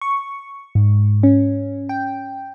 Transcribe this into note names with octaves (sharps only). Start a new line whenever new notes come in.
C#6
G#2
C#4
G5